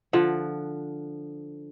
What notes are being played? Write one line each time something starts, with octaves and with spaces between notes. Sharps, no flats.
D3 F3 F#5